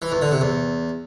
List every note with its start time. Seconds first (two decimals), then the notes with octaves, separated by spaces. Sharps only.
0.02 E3
0.12 E2
0.22 D3
0.31 C3
0.41 E2